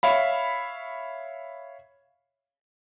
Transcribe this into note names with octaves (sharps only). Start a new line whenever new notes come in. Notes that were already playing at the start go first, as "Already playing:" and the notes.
C#5 E5 F5 B5